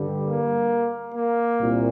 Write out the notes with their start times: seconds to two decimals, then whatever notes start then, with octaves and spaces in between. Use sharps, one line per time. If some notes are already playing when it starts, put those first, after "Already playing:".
Already playing: G2 D3 G3
0.25 A#3
1.15 A#3
1.60 C2 A#2